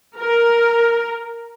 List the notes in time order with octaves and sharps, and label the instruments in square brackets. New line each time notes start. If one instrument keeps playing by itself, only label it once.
[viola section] A#4